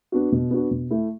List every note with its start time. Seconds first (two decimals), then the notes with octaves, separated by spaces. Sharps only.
0.12 B3 D4 F#4
0.32 B2
0.51 B3 D4 F#4
0.71 B2
0.91 A3 E4